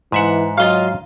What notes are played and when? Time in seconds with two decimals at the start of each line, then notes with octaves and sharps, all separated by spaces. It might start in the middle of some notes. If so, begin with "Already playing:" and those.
0.12 G#2 E3 E5 F#5
0.57 F#3 F4 D#5 F5